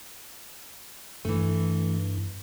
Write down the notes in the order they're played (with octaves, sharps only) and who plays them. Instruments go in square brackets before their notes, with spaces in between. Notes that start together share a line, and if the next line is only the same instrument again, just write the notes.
[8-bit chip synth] G2 [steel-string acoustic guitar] E3 A3